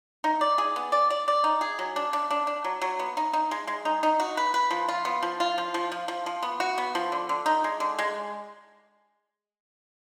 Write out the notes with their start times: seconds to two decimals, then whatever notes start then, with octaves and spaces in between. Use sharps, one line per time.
0.24 D#4
0.41 D5
0.58 G#4
0.76 B3
0.92 D5
1.10 D5
1.28 D5
1.44 D#4
1.61 G#4
1.79 F#3
1.96 D4
2.13 D4
2.31 D4
2.47 D4
2.64 F#3
2.82 F#3
2.99 B3
3.17 D#4
3.33 D#4
3.51 G#3
3.67 G#3
3.85 D#4
4.03 D#4
4.20 F#4
4.37 B4
4.54 B4
4.71 F3
4.89 F4
5.05 B3
5.23 F3
5.40 F4
5.58 F3
5.74 F3
5.92 F3
6.08 F3
6.26 F3
6.43 B3
6.60 F#4
6.78 B3
6.95 F3
7.12 D3
7.29 D3
7.46 D#4
7.64 G#3
7.80 D3
7.99 G#3